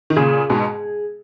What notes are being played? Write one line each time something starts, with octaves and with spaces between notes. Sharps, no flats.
D#3
A#2 C#3 G#4
G#2 B2